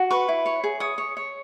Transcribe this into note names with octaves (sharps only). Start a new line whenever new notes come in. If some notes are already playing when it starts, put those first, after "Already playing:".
Already playing: F#4
B4 C#6
E4
C#5
G#4
C#5 D#6
C#5
C#5